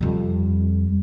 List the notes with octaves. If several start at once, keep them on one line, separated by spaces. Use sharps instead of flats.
F2 G3